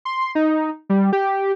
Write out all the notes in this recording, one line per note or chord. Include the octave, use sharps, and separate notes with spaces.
C6
D#4
G3
G4